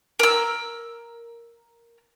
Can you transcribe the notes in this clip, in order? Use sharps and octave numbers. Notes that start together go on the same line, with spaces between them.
A#4 E6